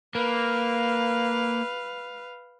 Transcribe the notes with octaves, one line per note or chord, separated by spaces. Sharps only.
A#3 B4 F5